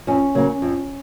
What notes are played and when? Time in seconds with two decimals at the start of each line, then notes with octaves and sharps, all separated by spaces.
0.07 F2 C#4
0.35 C#3 F#3 A#3
0.62 F2